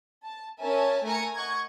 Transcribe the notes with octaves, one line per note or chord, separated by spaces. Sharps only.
A5
C#4 A#4 E5 G#5 A5
A3 A#4 G#5 A#5 C#7
D#5 F#5 C#6 G#6